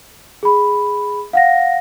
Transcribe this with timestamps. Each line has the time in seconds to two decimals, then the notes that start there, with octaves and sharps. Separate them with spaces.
0.43 G#4 B5
1.33 F5 F#5 A#6